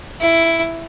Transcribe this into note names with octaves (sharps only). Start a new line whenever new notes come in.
E4